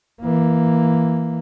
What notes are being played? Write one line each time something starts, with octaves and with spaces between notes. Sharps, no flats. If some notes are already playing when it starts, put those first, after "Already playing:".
E3 A#3